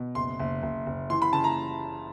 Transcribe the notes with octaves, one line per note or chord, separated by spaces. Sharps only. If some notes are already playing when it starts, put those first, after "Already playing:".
Already playing: B2
F#1 C6
F#1
F#1
F#1
E3 C6
B5
C#3 A5
A#5